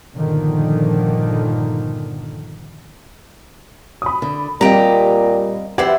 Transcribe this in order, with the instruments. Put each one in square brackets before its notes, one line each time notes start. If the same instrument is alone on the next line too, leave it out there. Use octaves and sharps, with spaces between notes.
[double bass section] G1 A#2 D3 D#3 F3
[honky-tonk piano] B5 D#6
[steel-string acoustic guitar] D3
[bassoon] A#2 [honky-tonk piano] G3 [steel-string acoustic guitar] C4 D#5 [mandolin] G4 A#5
[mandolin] E4 C5 D5 [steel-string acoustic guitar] G4 [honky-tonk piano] B4 F#5 G#6